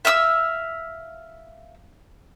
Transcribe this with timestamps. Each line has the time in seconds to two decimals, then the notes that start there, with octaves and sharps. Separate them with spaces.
0.05 E5 F5 D#6 E6